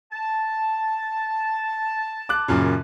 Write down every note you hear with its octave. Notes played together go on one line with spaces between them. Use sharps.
A5
D6 F#6
F#2 A#2 C#3